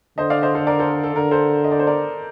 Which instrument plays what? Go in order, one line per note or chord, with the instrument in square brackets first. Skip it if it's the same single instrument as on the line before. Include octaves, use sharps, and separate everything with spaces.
[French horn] D3 [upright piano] C5 D#5
[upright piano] D5 F5
C5 D#5
A4 C5
A#4 D5
A4 C5
A#4
A4
[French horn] D3 [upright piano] A#4
[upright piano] A4 C5
D#5
D5
C5
A#4 D5